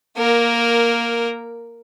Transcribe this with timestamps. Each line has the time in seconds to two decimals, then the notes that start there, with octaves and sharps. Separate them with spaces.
0.17 A#3 A#4